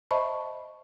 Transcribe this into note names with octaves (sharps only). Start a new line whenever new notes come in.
C5 D#5 E5 A5 B5 C#6